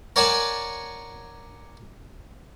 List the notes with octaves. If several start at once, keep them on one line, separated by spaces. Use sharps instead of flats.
A#4 C#5 D5 F#5 G#5 A5